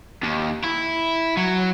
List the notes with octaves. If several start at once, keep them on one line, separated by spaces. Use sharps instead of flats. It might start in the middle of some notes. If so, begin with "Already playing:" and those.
D#2
E4
F#3